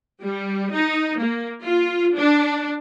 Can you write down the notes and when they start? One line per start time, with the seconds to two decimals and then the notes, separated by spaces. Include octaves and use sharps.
0.22 G3
0.71 D#4
1.19 A#3
1.61 F4
2.14 D4